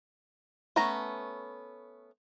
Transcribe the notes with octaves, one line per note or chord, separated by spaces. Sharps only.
A3 B3 C#4 A#5